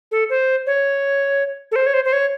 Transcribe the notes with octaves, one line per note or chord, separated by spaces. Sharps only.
A4
C5
C#5
A4
C5
C#5
C5
C5
C#5